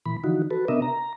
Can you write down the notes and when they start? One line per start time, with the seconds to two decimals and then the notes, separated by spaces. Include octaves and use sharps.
0.06 A#2 E3 B5
0.24 D3 E3 F3 D#4 F#4
0.51 F#4 A4 B4
0.68 C3 B3 D4 A#4 D#5 E5
0.82 A#5